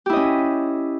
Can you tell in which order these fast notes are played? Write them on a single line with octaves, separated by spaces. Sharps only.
G4 E4 D#5 C#4